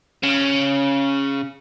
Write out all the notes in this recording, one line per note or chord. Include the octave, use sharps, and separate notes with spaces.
C#3